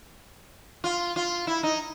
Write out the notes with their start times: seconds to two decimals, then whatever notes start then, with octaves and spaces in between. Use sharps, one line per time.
0.84 F4
1.16 F4
1.47 E4
1.63 D#4